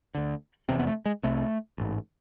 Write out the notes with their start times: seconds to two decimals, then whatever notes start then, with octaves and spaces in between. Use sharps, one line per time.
0.15 D2 D3
0.69 F1 E2 C3 C4
0.79 B3
0.87 A3
1.06 G#3
1.23 C2 C3 A3
1.78 A1 G#2